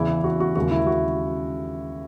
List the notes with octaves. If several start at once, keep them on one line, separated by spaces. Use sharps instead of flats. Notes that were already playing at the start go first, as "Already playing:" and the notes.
Already playing: E2 C#3 E3 E4
F#4
F#4
D#2 C#3 G#3 F#4
E4
F#4